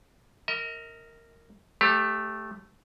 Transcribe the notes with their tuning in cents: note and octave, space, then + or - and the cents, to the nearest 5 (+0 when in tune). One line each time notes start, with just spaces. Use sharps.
A#4 -15 D#5 +40
A3 -5 G4 +20 C#5 -30